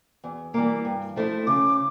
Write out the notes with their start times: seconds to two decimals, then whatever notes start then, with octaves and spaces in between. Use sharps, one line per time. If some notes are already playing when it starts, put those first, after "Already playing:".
0.24 E2
0.54 E3 G3 A#3
0.85 G2
1.16 F3 A3 E4
1.47 C#3 D6